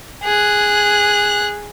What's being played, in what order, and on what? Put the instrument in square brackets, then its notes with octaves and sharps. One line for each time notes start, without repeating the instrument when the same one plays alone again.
[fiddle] G#4 F#6